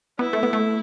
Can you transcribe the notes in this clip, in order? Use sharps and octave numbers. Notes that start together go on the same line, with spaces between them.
B3 E4
A3
B3
A3